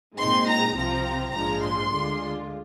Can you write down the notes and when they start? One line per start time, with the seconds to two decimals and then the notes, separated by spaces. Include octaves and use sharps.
0.18 A#2 G#3 C4 D#4 C6
0.48 A#5
0.77 C2 C3 F3 C4 A#5
1.35 A#1 G#2 F3 G#3 D4 A#5
1.64 C6
1.93 D2 D3 G#3 D4 F4